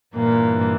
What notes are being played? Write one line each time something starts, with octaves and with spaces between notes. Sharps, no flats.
G2 A#2 E3 A#3